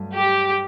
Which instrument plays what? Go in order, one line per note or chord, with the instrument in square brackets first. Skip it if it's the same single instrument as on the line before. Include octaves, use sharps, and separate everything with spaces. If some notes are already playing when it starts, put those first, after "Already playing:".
Already playing: [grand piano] G2 F#3 A3
[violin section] G4